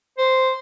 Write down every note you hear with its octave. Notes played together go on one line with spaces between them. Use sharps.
C5